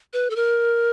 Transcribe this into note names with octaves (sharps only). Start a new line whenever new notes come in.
B4
A4
A#4